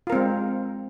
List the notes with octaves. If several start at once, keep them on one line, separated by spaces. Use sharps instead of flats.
G#3 C4 F4 A#4